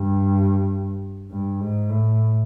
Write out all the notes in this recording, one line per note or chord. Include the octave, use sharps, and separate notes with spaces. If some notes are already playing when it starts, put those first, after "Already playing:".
Already playing: G2
G2
G#2
A2